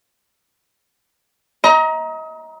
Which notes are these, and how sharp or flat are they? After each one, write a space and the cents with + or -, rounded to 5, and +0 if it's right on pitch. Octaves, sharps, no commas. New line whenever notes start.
D#5 +35 A#5 +15